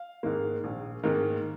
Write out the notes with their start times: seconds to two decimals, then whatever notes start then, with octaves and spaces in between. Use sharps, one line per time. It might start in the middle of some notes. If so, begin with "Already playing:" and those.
Already playing: F5
0.23 G#2 D#3 A#3
0.64 A#1
1.03 G#2 D#3 A#3